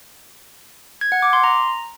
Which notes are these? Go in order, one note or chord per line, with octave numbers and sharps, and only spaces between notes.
G#6
F#5
D6
C6
A#5